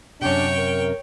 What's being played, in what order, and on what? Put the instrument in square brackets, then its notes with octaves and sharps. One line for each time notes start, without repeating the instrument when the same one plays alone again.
[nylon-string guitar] F#2 C3 [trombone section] C#4 D4 [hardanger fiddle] C#5 G5
[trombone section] A#4